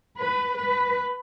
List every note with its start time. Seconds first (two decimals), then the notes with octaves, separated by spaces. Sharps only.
0.18 B4
0.58 B4